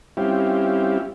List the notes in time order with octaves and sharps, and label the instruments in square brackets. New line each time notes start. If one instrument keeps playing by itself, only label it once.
[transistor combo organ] G3 C4 C#4 E4 F4 G4